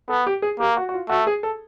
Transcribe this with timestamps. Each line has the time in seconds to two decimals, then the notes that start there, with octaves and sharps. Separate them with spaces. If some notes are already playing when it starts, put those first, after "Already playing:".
0.09 B3 A4
0.27 G4
0.42 G#4
0.60 A#3 G4
0.77 F#4
0.89 F#4
0.94 F4
1.09 A3 F#4
1.27 G#4
1.43 A4